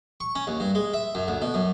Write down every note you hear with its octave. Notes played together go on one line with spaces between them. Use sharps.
C#6
C#4
D#2
G2
G#3
E5
F#2
D2
B2
F#2